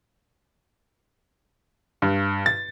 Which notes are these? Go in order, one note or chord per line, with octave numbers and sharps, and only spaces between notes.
G2
A6